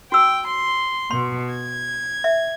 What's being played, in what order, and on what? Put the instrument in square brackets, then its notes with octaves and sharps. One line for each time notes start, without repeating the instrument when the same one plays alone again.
[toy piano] F#4 E6 [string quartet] G5
[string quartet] C6
[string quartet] B2 [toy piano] C6
[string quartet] G#6
[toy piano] E5